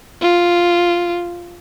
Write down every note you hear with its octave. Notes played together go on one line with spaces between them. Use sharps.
F4